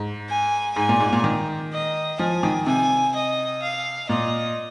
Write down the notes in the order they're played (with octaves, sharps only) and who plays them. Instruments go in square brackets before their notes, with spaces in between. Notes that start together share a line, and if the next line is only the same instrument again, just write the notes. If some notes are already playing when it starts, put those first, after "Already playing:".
Already playing: [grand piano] G#2
[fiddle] G#5
[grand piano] G#2 [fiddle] G#5
[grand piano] A#2
G#2
A#2
D#3
[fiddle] D#5
[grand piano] F3 [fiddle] G#5
[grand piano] D#3
[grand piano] C3 [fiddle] G#5
[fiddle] D#5
F5
[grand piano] A#2 [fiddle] D#5